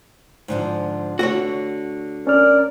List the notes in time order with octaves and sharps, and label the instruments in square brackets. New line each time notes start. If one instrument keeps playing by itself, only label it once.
[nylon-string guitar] G#2 D3 F3
[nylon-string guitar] D3 A3 [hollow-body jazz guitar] F#4 C#5
[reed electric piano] C#4 F6 [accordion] A#4 D5